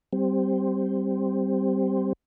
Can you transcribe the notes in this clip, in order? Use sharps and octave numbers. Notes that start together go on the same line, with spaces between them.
G3 C4